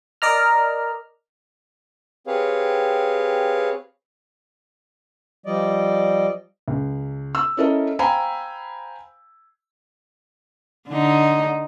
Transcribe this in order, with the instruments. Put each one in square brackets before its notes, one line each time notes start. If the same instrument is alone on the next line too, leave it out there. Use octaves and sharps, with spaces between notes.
[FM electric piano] A#4 D5 D#5 A#5 F6
[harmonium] C4 G4 G#4 B4 C#5 F5
F3 G3 D5 D#5
[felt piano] C#2
E6
C#4 E4 A4 A#4 D#5
C5 F5 G5 G#5 A#5 B5
[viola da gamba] D3 D#4